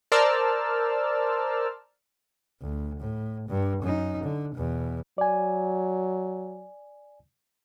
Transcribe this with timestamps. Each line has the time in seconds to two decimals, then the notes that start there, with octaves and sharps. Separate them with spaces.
0.12 A#4 C5 D5 A5 E6 F6
2.61 D2
3.00 A2
3.48 G2
3.83 F#2 D#4
4.23 D3
4.54 E2 B2
5.18 F#3 D5 G#5